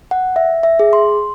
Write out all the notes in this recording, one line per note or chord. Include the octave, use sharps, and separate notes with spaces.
F#5
E5
E5
G#4
C6